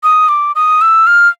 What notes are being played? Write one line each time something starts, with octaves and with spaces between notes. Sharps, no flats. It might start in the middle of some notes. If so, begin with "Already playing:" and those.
D#6
D6
D#6
E6
F6